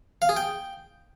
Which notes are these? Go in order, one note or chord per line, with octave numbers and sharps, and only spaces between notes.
F5
G#4
G5